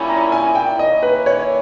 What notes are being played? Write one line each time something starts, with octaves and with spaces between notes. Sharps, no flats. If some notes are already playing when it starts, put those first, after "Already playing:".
Already playing: A#2 G3 C#4 E4
A#5
G#5
G5
D#3 A#3 C#4 E4 D#5
B4
C#5